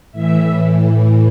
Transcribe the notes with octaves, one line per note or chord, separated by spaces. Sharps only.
A2 E3 E5